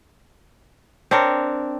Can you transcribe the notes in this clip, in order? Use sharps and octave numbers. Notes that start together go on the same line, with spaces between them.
C4 D4 A#4 C#5